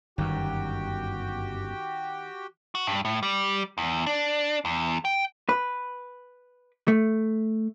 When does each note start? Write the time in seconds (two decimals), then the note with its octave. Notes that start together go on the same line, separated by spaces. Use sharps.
0.18 G1 F#2 D#3 F#4 G4 G5
2.75 F#4
2.87 G2
3.05 A2
3.23 G3
3.78 E2
4.06 D4
4.65 E2
5.05 G5
5.49 B4
6.88 A3